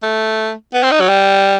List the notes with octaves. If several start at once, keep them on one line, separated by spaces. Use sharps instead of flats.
A3
B3
C4
D#4
F#3
G3